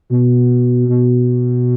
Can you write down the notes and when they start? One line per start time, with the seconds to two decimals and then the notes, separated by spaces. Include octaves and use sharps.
0.10 B2
0.88 B2